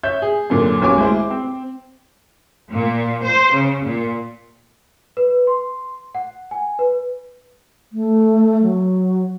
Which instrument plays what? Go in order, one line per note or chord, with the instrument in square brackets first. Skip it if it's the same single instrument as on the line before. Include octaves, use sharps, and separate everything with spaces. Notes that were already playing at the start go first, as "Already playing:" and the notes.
[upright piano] C#5 E5 G6
G#4
F#2 A#2 D3
D#1 B1 C#4 C#5 G#5 D6
G#3 E4 C5
C4
[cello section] A#2
C5
C#3
A#2
[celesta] B4
C6
F#5
G#5
B4
[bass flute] A3
F#3